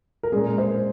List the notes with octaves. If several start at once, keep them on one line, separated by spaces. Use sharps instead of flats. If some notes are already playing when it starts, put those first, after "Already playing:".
A#4
A#2 G#3 C#4 G#4
C5